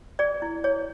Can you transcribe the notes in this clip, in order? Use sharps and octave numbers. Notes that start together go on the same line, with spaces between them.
G#4 D5
E4
G#4 C#5